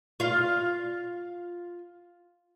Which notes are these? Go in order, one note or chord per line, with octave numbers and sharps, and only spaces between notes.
F4 F5